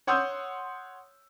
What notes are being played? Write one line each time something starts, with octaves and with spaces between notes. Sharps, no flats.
C#5 F#5 C6 D#6 E6 G6